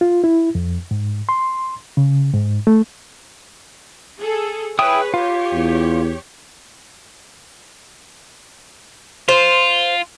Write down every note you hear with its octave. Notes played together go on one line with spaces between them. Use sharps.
F4
E4
F2
G#2
C6
C#3
G#2
A3
G#4 A4
E4 G#4 B4 C#5 G5 D#6
F4 G4 C#5 F5
E2
F4 C5